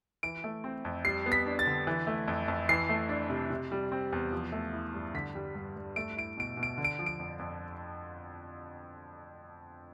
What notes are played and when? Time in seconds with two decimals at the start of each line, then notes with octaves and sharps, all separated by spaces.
0.23 E3 D7
0.44 A3
0.64 C4
0.85 F2
1.05 G3 C7
1.26 B3
1.32 B6
1.46 D4
1.59 A6
1.66 D3
1.87 E3
2.07 A3
2.28 F2
2.48 F2
2.69 E3 C7
2.89 A3
3.09 D4
3.30 C3
3.50 C3
3.72 G3
3.92 C4
4.12 E2
4.32 F3
4.52 A3
4.73 E4
4.94 G2
5.14 D3 B6
5.35 G3
5.55 G2
5.76 G2
5.96 A3 D7
6.17 E4 D7
6.37 B2 D7
6.57 B2
6.63 D7
6.78 D3
6.84 D7
6.99 F3
7.06 D7
7.19 F2
7.39 F2